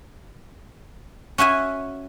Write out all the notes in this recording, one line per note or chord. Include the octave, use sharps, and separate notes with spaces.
C#4 F#4 E5 G#5